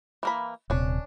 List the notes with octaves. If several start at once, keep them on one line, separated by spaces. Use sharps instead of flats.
E3 A#3 B5
D#1 C3 C#4 D4